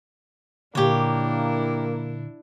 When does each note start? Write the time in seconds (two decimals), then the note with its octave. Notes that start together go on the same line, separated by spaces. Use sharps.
0.75 A#2 D3 A#3 D4 E4 G4 C#5